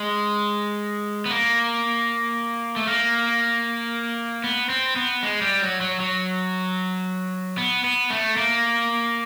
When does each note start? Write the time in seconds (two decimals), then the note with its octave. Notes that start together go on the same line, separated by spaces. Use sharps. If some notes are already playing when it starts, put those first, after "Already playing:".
Already playing: G#3
1.26 B3
1.31 A#3
2.76 A3
2.87 A#3
4.44 B3
4.69 C4
4.96 B3
5.23 G#3
5.42 G3
5.61 F#3
5.81 F#3
6.00 F#3
7.58 B3
7.84 B3
8.10 A3
8.37 A#3